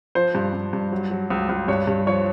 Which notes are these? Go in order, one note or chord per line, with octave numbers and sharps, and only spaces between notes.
F3 C5
G2
G2
G2
F#3
F#3
C#2
C#2
G2 C#5
G2
F3 C#5